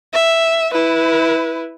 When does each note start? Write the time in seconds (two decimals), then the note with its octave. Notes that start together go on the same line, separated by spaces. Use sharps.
0.13 E5
0.72 E4 B4